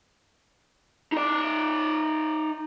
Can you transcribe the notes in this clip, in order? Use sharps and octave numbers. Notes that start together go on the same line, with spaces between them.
D#4 D5